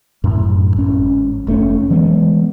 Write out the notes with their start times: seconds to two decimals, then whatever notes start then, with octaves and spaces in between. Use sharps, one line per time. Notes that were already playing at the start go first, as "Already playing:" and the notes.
0.24 F#2 A2
0.76 G#1 C#4
1.47 F1 A3 C4 C#4
1.90 E3 F#3 G#3 B3